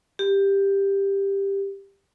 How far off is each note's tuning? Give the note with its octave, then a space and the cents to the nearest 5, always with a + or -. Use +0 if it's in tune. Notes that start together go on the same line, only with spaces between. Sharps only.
G4 +10